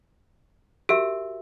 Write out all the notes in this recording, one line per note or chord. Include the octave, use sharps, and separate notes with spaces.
F#4 G4 A#4 E5